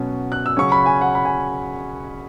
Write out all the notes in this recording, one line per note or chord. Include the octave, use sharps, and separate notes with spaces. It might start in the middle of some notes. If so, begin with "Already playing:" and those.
Already playing: B2 F#3 C#4
F#6
E6
C#3 F#3 C#4 C#6
B5
G#5
F#5
B5
G#5